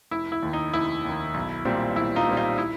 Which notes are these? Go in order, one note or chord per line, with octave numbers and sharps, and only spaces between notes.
F1 E4
E4
D#2 D#3
D#4
F1 E4
D#2 D#3
B1
A#2 G3 C4
B1 E4
D#4 F4
A#2 G3 C4
D#4 F4
E4